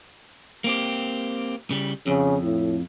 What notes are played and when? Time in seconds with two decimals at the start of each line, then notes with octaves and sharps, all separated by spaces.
0.64 A#3 C4 G4
1.70 C#3 G3
2.07 F2 C#3
2.43 A2